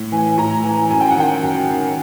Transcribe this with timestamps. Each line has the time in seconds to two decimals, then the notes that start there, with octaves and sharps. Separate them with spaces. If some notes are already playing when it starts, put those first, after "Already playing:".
Already playing: A2
0.12 E3 G#5
0.38 A2 A#5
0.64 E3 G#5
0.90 F#2 G#5
1.01 G5
1.11 F#5
1.16 D#3 G5
1.42 F#2
1.69 D#3